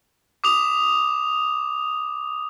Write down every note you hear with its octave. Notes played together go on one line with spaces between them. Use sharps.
D6 D#6 F7